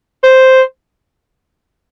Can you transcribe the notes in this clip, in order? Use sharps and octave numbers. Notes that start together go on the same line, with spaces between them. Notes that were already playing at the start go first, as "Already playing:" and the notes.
C5